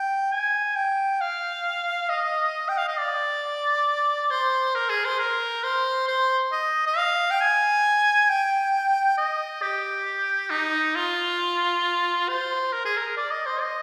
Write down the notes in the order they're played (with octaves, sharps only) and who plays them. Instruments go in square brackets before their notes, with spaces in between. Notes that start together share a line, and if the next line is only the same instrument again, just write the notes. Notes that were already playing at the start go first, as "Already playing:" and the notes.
Already playing: [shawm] G5
G#5
G5
F5
D#5
G5
F5
D#5
D5
C5
A#4
G#4
C5
A#4
C5
C5
D#5
D#5
F5
G5
G#5
G5
D#5
G4
D#4
F4
C5
A#4
G#4
A#4
D5
D#5
C5
D#5